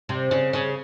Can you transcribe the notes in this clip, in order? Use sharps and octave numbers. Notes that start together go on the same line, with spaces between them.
C3
C#3
C#3